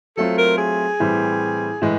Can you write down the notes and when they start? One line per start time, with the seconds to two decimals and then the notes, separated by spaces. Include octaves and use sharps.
0.17 F#3 A3 C4 F4 A4
0.38 A#4
0.58 G#4
1.00 A2 E3 G3 C4
1.82 A2 E3 G#3